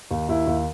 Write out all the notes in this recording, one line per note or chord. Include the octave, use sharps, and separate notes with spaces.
D#2
D#2 E4
D#2